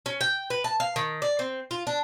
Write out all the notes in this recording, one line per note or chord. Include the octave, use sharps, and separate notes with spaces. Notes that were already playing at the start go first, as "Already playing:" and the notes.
C#4
G5
B4
A5
F5
D#3
D5
C4
F4
D4